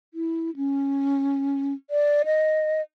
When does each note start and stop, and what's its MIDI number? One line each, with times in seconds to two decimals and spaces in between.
0.14 0.50 64
0.56 1.74 61
1.90 2.23 74
2.25 2.81 75